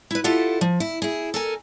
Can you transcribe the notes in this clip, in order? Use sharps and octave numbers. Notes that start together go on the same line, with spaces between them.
E4 B4
E4 F4 G4 A4 F#5
F3
E4
E4 G#4
A4 A#4 G#5